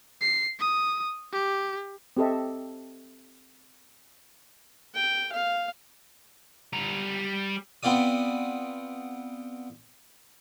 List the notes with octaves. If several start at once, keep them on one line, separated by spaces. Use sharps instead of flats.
C7
D#6
G4
C4 G4 A4 D#5 E5
G5
F5
G3 A#5
B3 C4 F4 D5 D#6